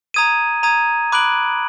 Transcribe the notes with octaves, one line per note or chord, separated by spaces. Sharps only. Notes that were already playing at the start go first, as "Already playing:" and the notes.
A#5 D#6 G#6 D#7
A#5 D#6 G#6 D#7
B5 D6 F#6 D7 F#7